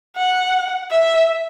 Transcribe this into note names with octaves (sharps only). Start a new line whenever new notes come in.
F#5
E5